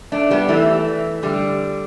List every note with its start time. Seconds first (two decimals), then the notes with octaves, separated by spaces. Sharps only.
0.12 A3 D4
0.30 G3 B3
0.49 E3 A3
1.22 D3 G3